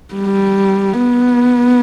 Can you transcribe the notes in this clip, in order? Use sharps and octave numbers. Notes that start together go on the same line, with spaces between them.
G3
B3